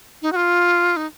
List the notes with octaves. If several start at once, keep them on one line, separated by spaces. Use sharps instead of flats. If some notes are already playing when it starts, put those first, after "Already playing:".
D#4
F#4
F4
D#4